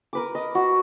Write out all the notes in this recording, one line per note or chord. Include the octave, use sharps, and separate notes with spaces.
A#4 B4 D6
D#5
F#4